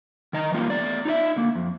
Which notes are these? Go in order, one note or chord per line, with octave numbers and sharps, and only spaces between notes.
D#3 D#5 A#5
E3 G3 A#3 F4
A3 B3 D5
D#4 F4 D5 E5
D3 A#3
F2